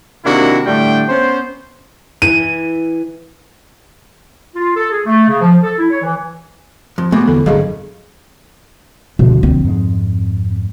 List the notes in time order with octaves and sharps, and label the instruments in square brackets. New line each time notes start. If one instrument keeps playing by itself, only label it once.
[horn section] C3 D#3 A#3 D4 E4 F#4
A2 D3 G3 A3 D4 G5
B3 C#4 C5
[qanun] E3 [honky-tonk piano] D#7
[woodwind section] F4
A4
G#4
A3
C#3
F3
A4
E4
C#5
E3
[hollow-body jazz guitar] F2
[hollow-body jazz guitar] B2 [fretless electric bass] G#3 A3 [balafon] B3 D6
[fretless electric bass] E2 D3 E3 [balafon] A4
[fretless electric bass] D#1 G#1 F#3 [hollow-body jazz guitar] D2 G2 [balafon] G#4 D#5 F5
[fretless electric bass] D2 D3 F3 [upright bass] B2
[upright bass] C4
[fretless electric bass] F2 G#2 G#3